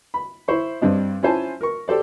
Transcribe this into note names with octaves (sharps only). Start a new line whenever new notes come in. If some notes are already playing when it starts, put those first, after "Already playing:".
B5
E4 C5 C#6
G2 C4 D4 D#5
C#4 E4 F4 C5 G#5 A5
A#4 C#6
G4 A4 C5 D5